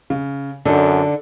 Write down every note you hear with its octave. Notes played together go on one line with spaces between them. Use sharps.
C#3
F#2 D3 D4 D#4 A4